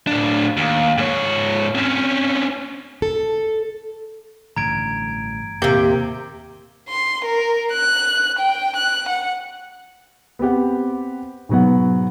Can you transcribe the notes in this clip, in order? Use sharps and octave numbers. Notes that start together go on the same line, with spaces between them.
A2 D4
D#2
G#2 C#5
C4 C#4
A4
A1 G2 D3 A#5 G#6 D7
D#2 A2 C3 A#3 G4 G5
C6
A#4
F#6
G5
F#6
F#5
B3 C4 G4 F#5
G#2 B2 F#3 B3 F#5